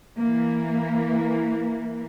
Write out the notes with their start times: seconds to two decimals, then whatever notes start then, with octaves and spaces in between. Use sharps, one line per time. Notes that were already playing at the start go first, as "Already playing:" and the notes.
0.17 E3 A#3